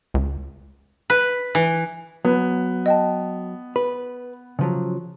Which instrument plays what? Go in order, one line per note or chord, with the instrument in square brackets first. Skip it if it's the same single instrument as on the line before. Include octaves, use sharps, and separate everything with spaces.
[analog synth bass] C#2
[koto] B4
E3
[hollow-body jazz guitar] F#3 [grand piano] B3
[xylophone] D#5 G5 A5
[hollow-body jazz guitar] B4
C#3 F3 F#3